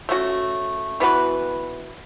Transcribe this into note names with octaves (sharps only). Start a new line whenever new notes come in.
A3 C#4 F#4
E3 B3 F#4 B4